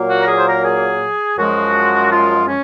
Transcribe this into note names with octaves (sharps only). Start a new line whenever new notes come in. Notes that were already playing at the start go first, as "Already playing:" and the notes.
Already playing: A#2 F#3 A#3
F#4
A#4
G#4
C5
A#4
G#4
F#2 F3 G#3 F#4
F4
C#4